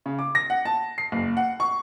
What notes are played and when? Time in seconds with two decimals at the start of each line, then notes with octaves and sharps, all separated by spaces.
0.06 C#3
0.19 D6
0.35 A#6
0.50 F#5
0.65 A5
0.98 C7
1.12 F#1
1.37 F#5
1.60 C#6